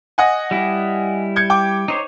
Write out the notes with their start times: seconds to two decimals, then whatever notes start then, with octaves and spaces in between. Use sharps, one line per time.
0.18 D#5 F#5 G#5
0.51 G3 E4
1.36 G6 G#6 C#7
1.50 G5 D6
1.88 D#4 C5 C#5